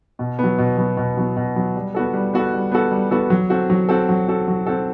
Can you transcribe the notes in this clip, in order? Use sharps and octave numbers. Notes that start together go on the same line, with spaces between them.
B2
F#3 B3
B2
F#3 B3
B2
F#3 B3
B2
F#3 B3
G3
B3 F#4 A4
G3
B3 F#4 A4
G3
B3 F#4 A4
G3
B3 F#4 A4
F#3
C4 F#4 A4
F#3
C4 F#4 A4
F#3
C4 F#4 A4
F#3
C4 F#4 A4